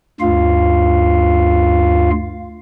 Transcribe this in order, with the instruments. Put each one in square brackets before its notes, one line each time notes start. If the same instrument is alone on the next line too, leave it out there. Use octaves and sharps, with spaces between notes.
[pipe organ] D2 G2 F4 F5